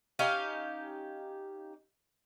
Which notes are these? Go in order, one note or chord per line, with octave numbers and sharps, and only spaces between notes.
C#4 D#4 G4 F5